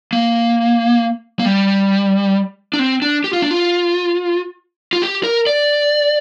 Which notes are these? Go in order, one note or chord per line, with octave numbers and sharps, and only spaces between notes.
A#3
A#3
G3
D4
C4
D4
G4
F4
D4
F4
F4
G4
A#4
D5